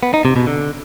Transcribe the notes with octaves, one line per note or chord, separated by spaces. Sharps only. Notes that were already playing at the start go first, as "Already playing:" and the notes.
B3
D#4
C3
B2
D3